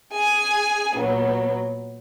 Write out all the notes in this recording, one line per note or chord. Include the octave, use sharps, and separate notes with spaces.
G#4 G#5
A#2 F#3 B3